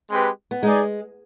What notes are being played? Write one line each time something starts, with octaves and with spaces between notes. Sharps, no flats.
G#3 C4 G4 B4
B3
G#3 D#4 G#4 D5